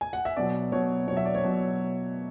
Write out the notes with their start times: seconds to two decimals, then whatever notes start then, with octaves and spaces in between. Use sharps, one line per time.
0.01 G#5
0.13 F#5
0.25 E5
0.36 B2 F#3 D5
0.72 B2 F#3 C#5
1.07 B2 C#5
1.12 F#3 E5
1.25 D5
1.35 C#5
1.43 B2 F#3